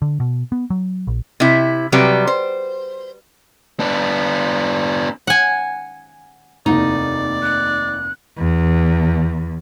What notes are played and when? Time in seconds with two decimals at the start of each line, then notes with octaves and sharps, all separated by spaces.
0.02 D3
0.20 B2
0.52 B3
0.70 F#3
1.07 A#1
1.40 C3 E4
1.92 C3 F#3 G3 B4
2.27 C5
3.80 B3 D4
5.27 F#5 G#5
6.66 F1 D#2 D#4 D5
7.42 F#6
8.38 E2